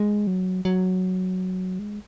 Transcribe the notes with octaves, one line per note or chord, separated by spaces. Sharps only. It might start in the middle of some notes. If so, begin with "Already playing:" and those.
Already playing: G#3
F#3
F#3
G#3